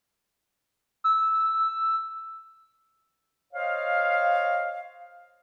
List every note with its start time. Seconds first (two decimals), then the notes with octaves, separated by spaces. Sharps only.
1.04 E6
3.53 C5 C#5 D#5 F5